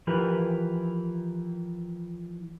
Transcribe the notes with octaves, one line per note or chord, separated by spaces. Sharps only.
E3 F3 G4 A#4 B4